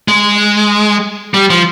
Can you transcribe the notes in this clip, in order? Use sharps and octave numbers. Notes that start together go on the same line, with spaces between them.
G#3
G3
F3